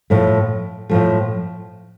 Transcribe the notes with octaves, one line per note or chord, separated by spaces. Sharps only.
A2 F3 A3
A2 F3 A3